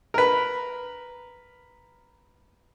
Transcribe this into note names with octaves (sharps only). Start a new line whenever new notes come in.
A#4 B4